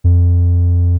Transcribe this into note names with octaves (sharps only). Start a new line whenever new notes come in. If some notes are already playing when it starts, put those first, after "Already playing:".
F2